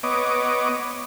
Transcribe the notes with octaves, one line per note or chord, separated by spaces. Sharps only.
B3 C#5 D#5 D6